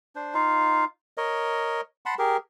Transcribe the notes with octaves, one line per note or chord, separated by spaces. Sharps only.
D4 C5
D#4 F4 F5
A#4 C#5 D#5
F#5 A5 B5 C6
G4 G#4 A#4